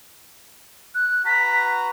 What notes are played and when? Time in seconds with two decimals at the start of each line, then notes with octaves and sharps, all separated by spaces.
0.95 F#6
1.26 F#4 B4 A#5 B6